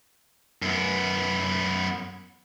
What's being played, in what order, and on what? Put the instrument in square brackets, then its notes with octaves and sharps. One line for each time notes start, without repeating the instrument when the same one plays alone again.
[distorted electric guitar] F#2 B3